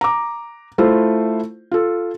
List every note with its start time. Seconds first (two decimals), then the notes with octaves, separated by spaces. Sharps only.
0.01 A#5 D6
0.78 A3 E4 F4 C5
1.71 F4 A4